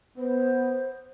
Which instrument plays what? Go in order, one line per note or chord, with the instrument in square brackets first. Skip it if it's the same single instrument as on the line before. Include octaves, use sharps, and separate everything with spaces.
[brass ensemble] B3 [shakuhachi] C5